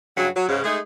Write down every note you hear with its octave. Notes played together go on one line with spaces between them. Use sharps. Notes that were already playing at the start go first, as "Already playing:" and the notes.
G2 C#3 F#3
F#3
G#2 C#3
G#3 A3 D#4 G#4